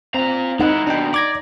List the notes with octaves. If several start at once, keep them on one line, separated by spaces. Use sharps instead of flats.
C4 F4 A#5
G#3 D#4 E4 F#5
D#2 B2 D4 G5
D5 D6 G#6 A#6